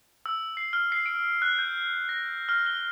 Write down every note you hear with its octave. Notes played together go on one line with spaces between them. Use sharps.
E6
C7
F6
C7
D7
F#6
G6
A#6
F6
G7